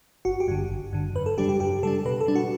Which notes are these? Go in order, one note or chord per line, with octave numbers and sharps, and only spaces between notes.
G1 F#4
G4
G2 D3
G1
G2 D3
F#2 B4
A4
C#3 G3 D4 G4
G4
F#2 G4
C#3 G3 D4 A4
B2 B4
A4
G3 D4
F#4